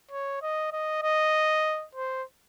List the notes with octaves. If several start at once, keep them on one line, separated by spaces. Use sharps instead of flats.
C#5
D#5
D#5
D#5
C5